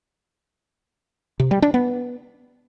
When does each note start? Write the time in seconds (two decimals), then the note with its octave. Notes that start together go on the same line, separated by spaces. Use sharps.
1.40 C3
1.51 G3
1.62 D4
1.74 B3